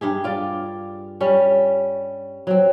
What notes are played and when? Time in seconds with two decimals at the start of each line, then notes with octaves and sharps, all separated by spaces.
0.01 G2 G4 G#4
0.24 F4 D5
1.21 G3 C#4
2.47 F#3 C4